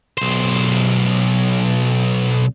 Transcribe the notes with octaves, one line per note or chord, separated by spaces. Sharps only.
B1 C5